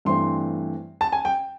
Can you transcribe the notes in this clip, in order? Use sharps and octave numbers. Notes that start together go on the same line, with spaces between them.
G2 E3 A3 C4 C6
A5
G#5
G5